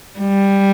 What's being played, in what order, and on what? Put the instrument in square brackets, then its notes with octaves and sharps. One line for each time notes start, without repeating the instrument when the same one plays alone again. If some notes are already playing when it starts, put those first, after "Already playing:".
[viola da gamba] G3